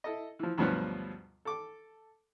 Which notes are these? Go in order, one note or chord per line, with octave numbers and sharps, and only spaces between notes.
E4 A4 D#5
E3 F3
D2 G2 B2 F3 F#3 B3
A4 D6